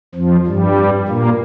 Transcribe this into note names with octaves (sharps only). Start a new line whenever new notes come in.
F2 F3
G2 G3
A#2 A#3